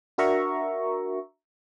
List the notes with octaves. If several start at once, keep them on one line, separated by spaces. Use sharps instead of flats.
D4 F#4 A#4 E5 A#5 C#6